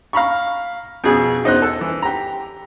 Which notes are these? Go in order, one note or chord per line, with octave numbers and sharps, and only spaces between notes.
F5 A#5 B5 C#6
F2 B2 G#4
E2 D#4 C5 D#5 F#6
A4
E3
G4 A#5